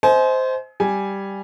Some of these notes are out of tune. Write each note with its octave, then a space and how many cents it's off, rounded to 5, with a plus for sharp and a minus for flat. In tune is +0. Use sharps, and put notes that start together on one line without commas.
C5 -10 D#5 +30 G#5 +35
G3 +0 G#5 +0